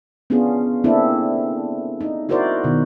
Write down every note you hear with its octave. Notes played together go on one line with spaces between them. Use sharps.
B3 C#4 D4 F4 G#4
A#3 C4 D4 E4 A4
D#4
E4 F#4 A#4 C5 D5
B2 D#3